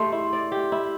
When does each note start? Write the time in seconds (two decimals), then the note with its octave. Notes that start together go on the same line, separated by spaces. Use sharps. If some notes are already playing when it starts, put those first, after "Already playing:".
Already playing: A3 G4 D5 C6
0.12 E4
0.33 D5
0.52 G4
0.72 E4